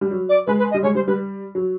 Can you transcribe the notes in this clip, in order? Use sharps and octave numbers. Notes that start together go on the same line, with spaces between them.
G3
F#3
D5
G#3 B4
B4
D#5
G3
G#3 C#5
G3 C5
G3 B4
F#3